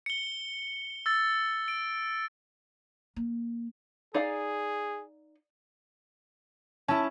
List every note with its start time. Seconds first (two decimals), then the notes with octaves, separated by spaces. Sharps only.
0.06 C#7 G7
1.06 E6 A6
1.68 D7
3.16 A#3
4.14 D#4 G#4 D5 F5
6.88 C#4 E4 A5